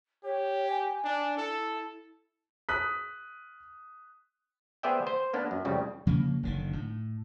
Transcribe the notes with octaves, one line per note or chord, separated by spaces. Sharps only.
G4 C#5
G#5
D4
E4 A4
D#6 F#6 B6
B3 G#4 C5 D5 E5 G5
C5
A#3 B3 D4
F#2
C2 F2 C#3 G3 A3
C#3 F3 A#3
F#1 D3 D#3
A2